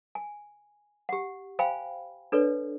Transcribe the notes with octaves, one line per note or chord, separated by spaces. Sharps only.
G#5
G4 F#5
C5 F5 G5 G#5 B5
D4 A4 B4 C#5 D5